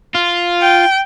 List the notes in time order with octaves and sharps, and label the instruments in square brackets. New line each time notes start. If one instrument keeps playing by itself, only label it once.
[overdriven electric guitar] F4
[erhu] G5